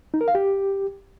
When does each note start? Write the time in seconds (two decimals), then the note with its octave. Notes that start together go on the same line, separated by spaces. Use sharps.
0.14 D#4
0.21 A#4
0.28 F5
0.35 G4